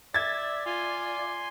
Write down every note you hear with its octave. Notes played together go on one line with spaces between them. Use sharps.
D5 E5 G#6 A6
F4 G#5 C6